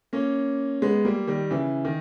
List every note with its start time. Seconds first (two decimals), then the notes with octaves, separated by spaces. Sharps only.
0.13 A#3 C#4
0.82 G#3 B3
1.05 G3 A#3
1.27 D#3 G3
1.51 C#3 E3
1.85 D#3